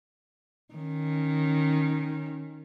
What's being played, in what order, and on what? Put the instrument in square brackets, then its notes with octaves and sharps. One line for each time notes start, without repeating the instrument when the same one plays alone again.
[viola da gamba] D#3 C#4